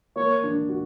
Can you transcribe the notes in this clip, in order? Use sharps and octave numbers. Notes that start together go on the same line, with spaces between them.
A#3 C#5
D4
F#4